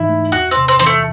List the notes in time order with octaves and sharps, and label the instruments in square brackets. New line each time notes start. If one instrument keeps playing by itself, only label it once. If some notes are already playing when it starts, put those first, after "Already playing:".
Already playing: [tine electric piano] G#2 E3 D#4 [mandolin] E4
[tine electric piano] A3
[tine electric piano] E2 [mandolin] F#4
[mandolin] C4
[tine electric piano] C3
[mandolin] C4
[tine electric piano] E3 [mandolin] C4
[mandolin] A3